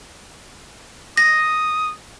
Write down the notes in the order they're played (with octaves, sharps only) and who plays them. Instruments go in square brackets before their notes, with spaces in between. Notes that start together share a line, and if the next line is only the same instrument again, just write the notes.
[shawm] D#6 [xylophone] A#6